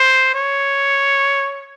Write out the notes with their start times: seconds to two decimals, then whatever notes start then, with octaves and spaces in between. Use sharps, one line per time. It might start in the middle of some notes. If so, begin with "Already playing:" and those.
Already playing: C5
0.34 C#5